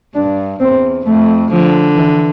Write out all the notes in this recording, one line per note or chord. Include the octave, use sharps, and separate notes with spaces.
G2 D4
E2 C4
F2 A3
D3 F3
E3